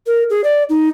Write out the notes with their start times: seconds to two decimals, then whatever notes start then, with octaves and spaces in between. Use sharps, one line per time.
0.07 A#4
0.30 G#4
0.44 D5
0.69 D#4